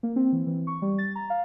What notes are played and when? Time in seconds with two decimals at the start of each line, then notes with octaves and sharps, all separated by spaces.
0.03 A#3
0.16 C4
0.32 E3
0.47 E3
0.67 C#6
0.82 G3
0.98 A6
1.15 A#5
1.30 F5